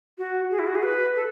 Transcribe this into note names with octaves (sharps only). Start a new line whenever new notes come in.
F#4
G#4
E4
F#4
G#4
B4
A4